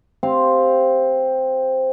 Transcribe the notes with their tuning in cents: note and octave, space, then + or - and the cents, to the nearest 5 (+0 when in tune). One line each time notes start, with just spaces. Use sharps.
C4 +0 G4 +0 F5 +0